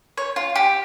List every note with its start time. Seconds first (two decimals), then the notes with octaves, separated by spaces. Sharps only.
0.18 C#5
0.36 F4
0.56 G4